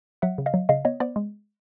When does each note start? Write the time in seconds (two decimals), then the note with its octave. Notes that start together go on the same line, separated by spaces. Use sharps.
0.22 F#3 E5 F#5
0.38 C#3
0.46 D#5 F5
0.54 F#3
0.69 C#3 D#5 F5
0.85 B3 C#5 D#5
1.00 B3 C5 D5
1.16 G#3